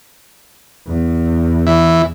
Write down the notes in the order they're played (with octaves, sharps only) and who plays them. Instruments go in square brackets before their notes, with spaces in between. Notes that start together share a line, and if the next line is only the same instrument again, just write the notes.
[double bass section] E2
[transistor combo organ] E3